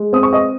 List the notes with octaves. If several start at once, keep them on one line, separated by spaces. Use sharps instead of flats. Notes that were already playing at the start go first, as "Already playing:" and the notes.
Already playing: G#3
C4 D#6
C#6
D#5 D#6